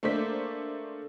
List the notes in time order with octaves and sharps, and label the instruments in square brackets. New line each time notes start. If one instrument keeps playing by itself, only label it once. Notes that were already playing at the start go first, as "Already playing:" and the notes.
[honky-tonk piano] A3 A#3 D4 C5 B6